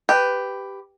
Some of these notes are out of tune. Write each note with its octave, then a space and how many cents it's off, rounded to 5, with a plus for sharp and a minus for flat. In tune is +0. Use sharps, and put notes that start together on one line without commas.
G4 +0 B4 +10